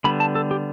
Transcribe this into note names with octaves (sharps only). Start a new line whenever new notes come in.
D3 G3 B3 B5
A5
A4
G4